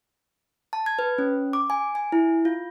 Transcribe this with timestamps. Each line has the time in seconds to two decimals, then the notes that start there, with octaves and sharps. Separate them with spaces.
0.73 A5
0.86 G#6
0.99 B4
1.18 C#4
1.53 D6
1.70 G#5
1.95 G#5
2.12 E4
2.45 F4